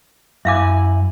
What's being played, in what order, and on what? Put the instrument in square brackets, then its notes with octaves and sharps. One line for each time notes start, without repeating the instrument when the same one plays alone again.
[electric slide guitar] F#2 E4 G#5 [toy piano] E5 F5 D6